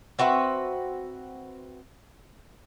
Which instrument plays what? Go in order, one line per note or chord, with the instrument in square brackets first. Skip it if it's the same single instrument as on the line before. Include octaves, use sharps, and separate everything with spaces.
[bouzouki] C4 F#4 B4 E5